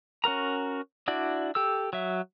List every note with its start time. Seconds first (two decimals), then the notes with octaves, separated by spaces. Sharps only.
0.24 C#4 F#4 A#4 A#5
1.08 D4 E4 F#4 D5
1.55 G4 A4 E6
1.93 F#3 E5